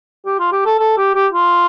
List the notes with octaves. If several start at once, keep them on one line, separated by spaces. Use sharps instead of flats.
G4
F4
G4
A4
A4
G4
G4
F4